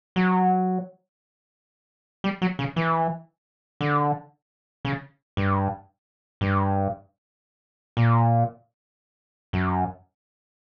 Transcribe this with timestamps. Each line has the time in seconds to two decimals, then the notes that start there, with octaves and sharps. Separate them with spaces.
0.16 F#3
2.24 G3
2.42 F#3
2.59 C#3
2.76 E3
3.81 D3
4.85 C#3
5.37 G2
6.41 G2
7.97 A#2
9.53 F#2